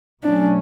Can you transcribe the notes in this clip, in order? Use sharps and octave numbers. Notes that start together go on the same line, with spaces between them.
B2 F#3 A3 C#4 D4